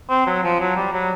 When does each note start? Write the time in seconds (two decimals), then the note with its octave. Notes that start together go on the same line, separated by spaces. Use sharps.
0.10 C4
0.26 F#3
0.43 F3
0.60 F#3
0.76 G3
0.93 F#3